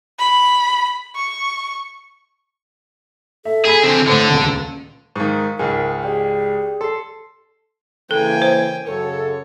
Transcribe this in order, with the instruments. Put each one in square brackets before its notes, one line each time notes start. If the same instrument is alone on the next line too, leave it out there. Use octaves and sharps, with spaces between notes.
[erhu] B5
C#6
[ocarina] A4 [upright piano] E5
[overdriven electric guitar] G#4 [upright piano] G#5 B5 B6
[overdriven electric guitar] D3 C4
[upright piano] A2 C5 C#7 [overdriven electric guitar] D3 D4
[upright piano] D#1 C#2
[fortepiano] G#2 D#3 [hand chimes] F5 C#6
[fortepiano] C#2 G#2 G#3 [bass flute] A#4 [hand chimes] G5 G#5 F6
[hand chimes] G4 D5 G5 [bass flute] G#4
[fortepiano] A4 [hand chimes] C6 C7
[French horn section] C#3 E3 A#3 [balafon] A4 [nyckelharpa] G5 G#5
[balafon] C5
[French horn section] F#2 C#3 A4 [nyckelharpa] C#5